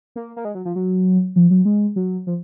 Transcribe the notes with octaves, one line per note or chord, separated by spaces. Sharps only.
A#3
A#3
G#3
F#3
F3
F#3
F3
F#3
G#3
F#3
F3